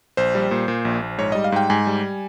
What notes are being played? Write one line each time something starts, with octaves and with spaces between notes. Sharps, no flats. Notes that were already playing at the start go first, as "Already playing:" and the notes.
A#1 C5
G3
A#2
A#2
A#1
A#1
G#2 C#5
G3 D#5
F5
G#2 G5
G#2 G#5
G3